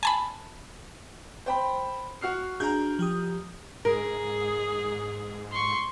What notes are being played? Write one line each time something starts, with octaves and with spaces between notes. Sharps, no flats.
G#5 A5 B5
C5 G5 B5
F#4 F6 C7
D4 F#4 G#4 A#5 G6
F3 G4 D#6
G#2 G#4 A#4
C6 C#6